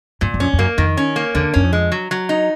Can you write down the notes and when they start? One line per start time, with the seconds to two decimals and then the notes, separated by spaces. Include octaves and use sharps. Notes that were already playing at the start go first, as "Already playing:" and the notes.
0.21 G2 A#2
0.34 F#2
0.40 F2 C#4
0.53 F2
0.59 F#2 A#3
0.78 F2 D#3
0.97 C#4
1.16 A#3
1.35 E2 D3
1.54 F#2 C#4
1.63 F2
1.73 G#3
1.92 F#3
2.11 F#3
2.29 D#4